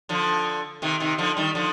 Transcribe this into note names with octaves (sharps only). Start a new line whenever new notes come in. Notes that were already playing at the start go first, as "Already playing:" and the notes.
D3 F3
C3 D#3
C3 D#3
D3 F3
D#3 G3
D3 F3